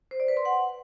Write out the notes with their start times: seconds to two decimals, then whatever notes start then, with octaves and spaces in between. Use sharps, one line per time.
0.11 C5
0.20 D5
0.28 B4
0.37 C6
0.45 F#5